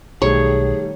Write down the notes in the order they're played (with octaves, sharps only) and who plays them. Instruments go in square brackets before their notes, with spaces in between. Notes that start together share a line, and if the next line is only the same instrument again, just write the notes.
[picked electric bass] B1 [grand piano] D#3 G3 A3 [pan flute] G#4 [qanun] C#5